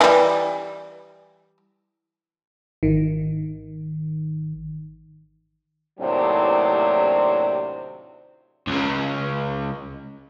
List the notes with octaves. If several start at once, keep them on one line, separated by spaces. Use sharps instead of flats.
E3 G3
G#1 D#3
D#2 A2 C3 F#3 C4 D4
C#2 C#3